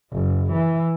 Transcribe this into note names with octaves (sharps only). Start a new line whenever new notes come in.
F#1
E3